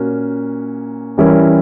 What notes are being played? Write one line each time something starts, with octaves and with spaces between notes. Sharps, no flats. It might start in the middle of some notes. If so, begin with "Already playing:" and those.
Already playing: A#2 A#3 C#4 F#4
E3 G3 C#4 E4 A#4